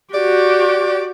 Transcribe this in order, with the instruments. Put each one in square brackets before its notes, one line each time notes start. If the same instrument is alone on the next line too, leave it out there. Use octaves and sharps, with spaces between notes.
[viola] F#4 G4 [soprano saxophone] D5